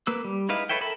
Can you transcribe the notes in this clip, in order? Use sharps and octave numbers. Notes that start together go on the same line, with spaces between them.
A#3 B4 E6
G3
G#3 D#4 E4 B4 F5
A4 B4 C#5 E5 G5
A4 A#4 E5 A5 B5